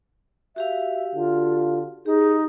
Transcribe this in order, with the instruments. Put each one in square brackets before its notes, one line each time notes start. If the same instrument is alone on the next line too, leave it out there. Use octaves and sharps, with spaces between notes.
[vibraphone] F#4 G4 F5 [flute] E5
[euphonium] D3 [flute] F4
[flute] D#4 [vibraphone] G4 [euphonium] G#4